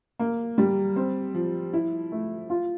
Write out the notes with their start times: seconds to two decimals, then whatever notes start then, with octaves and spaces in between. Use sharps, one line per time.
0.19 A#3
0.58 G3
0.96 C4
1.34 F3
1.73 E4
2.12 A3
2.50 F4